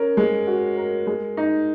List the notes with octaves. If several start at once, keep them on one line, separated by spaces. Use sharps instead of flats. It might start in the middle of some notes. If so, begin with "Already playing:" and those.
Already playing: C#4 A#4
G#3
F#4
A#4
G#3
D#4